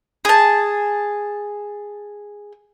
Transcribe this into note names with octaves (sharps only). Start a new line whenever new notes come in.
G#4 A5